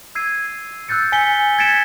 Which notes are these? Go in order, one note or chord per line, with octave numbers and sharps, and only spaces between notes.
E6 G#6 C7 D#7
E6 F#6 G6 A6 C#7
G#5 B6 C#7 G7
G#6 A6 B6 C#7 D7 E7